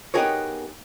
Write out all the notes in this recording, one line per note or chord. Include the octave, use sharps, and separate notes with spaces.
B3 D#4 G4 G#4 A#4 C#5